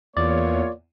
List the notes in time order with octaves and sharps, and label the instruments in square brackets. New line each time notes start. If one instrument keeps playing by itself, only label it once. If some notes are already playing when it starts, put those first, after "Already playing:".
[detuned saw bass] E2 [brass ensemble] A#3 F4 C#5 [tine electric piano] D5